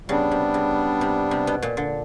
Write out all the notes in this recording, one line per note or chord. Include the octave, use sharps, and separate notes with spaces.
C#3 G3 B3 D4
C3
C#3
C3
C3
B2
A#2
D3